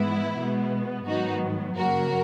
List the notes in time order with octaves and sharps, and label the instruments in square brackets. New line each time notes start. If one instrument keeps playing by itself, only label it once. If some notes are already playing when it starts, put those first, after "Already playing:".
Already playing: [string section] G#2 E3 G#3 B3 E4
B2 G#3 B3
G#2 D#3 F#3 B3 D#4 F#4
F#2 C#3 F#3 A#3 F#4 A#4